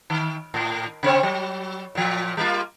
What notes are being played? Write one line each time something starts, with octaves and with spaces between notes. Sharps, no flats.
D#3
A2
C#3 C4 C#5
F#3
A#2 F3
G3 A#3 F4